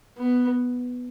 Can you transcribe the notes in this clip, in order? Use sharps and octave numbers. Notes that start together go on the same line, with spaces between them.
B3